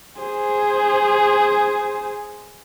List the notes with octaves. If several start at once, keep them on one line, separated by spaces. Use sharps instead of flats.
G#4 C5